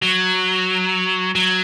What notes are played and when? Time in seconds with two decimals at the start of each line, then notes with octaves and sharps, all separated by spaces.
0.02 F#3
1.35 F#3